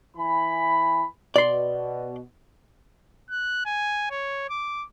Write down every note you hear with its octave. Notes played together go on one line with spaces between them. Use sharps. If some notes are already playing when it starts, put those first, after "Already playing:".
E3 G#5 B5
B2 D5 C6
F#6
G#5
C#5
D6